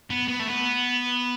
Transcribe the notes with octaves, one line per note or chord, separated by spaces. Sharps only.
B3
B3
A3
B3